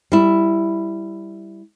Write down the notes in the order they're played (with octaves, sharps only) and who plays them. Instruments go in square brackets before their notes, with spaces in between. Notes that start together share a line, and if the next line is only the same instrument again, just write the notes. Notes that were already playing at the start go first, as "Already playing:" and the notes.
[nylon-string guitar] G3 E4